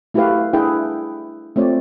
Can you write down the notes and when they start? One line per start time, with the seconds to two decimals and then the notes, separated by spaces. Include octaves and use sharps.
0.14 A3 E4 F#4 G4 B4 F5
0.53 D4 E4 G#4 B4 G5
1.56 A3 C4 F4 C#5 D5